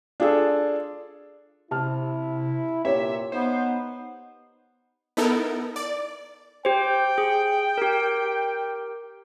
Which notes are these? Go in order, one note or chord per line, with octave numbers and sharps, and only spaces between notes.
D4 F4 G#4 A4
C3 E4 A5 F6
A#2 G4 C#5 E5
B3 D#4 C5
B3 D#4 E4 A4 A#4
D5
G4 C5 G5
G#4
G4 A#4